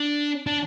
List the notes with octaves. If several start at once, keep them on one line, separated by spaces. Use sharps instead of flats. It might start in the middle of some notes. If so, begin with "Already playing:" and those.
Already playing: D4
D4